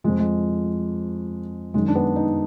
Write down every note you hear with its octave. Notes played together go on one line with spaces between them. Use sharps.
F2 F3 G#3
G#3
F#2 D#3 F#3 G#3
D4
B3
D#4